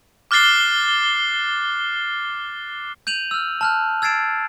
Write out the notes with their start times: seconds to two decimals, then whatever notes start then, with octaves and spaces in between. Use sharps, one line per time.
0.31 D6 F6 F#6 A6 C7 G7
3.07 G6 D#7 F7 F#7
3.31 E6 F6
3.61 A5 F6 F#6
4.02 E6 G#6 A6 C7 D7 E7